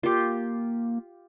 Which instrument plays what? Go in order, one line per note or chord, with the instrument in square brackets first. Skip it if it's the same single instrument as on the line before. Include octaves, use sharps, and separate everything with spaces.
[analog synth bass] A#3 [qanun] F4 G4